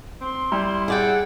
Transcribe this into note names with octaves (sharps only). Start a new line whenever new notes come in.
C4 C6
G3 E4
G#4 D5 F#5 G5